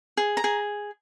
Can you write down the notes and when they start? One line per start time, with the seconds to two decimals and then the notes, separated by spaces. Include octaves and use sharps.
0.17 G#4
0.37 A#5
0.44 G#4